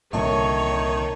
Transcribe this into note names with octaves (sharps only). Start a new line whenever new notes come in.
C2 A#2 D3 D#3 C#5 E5 A5